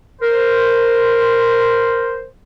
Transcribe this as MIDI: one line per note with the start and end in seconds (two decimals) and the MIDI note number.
0.22 2.25 70
0.22 2.25 72